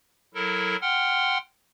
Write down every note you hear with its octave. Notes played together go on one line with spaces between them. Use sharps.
F#3 E4 A4 A#4
F#5 G5 C6 F6